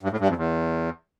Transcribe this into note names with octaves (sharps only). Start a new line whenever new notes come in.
G2
A2
G2
F2
E2